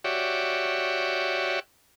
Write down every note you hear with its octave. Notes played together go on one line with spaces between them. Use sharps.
F#4 G4 C#5 D5 E5